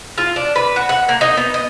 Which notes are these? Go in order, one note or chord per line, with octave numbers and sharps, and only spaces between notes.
F4
D4
B4
F#4
F#5
A#3
D#4
B3
D#5